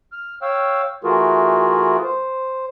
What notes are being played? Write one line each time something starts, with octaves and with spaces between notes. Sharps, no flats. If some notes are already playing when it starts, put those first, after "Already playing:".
F6
C#5 F5 G5 E6
E3 A3 F4 F#4 G#4 A#4
C5